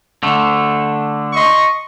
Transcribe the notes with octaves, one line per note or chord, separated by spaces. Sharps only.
D3 A3
D#5 C6 C#6